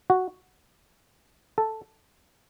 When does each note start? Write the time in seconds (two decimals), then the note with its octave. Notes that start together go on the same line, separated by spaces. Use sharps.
0.10 F#4
1.58 A4